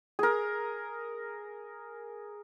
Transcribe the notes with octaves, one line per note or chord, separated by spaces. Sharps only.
G#4 A#4